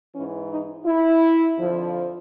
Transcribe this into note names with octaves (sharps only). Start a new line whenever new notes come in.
G#2 E3 C#4
D#4
E4
F2 D3 F3